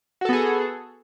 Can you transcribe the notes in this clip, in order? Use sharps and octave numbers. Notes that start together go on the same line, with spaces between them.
B3 F#4 G#4 A4